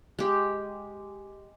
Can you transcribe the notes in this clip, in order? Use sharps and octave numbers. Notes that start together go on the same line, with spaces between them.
G#3 G4